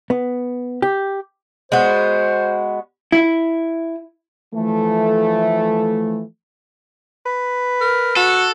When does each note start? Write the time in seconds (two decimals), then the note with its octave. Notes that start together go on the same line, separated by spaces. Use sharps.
0.10 B3
0.82 G4
1.72 G#3 B3 F#4 C5
3.12 E4
4.55 E3 F3 A3
7.26 B4
7.81 A#4
8.16 F#4 A4